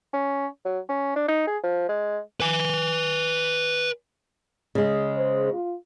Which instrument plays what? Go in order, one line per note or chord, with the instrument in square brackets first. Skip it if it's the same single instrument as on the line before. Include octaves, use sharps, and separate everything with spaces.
[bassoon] C#4
F#3
C#4
D4
D#4
G#4
F3
G#3
[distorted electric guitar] B4 G#5
[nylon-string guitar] C#3 G#3
[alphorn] C5
F4